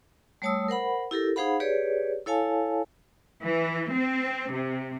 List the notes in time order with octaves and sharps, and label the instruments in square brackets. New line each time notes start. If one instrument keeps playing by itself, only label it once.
[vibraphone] G3 A3 C#5 A5 D#6 E6
A#4 C5 F#5 B5
E4 G4 A4 A#4
D#4 G#4 C5 F5 F#5 B5
G4 G#4 B4 C#5 D5
E4 A4 C#5 F5 G#5 A5
[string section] E3
C4
C3